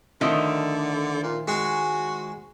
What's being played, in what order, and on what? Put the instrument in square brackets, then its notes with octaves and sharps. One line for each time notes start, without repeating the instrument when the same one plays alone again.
[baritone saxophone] D3 [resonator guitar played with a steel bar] D#3 F3 A3
[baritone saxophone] A#2
[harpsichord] G#3 [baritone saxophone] F#4